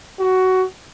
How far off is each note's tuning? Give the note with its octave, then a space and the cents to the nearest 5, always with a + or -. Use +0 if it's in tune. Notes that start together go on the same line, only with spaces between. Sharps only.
F#4 +15